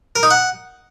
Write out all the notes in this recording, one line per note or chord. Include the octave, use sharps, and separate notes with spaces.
A#4
D#4
F#5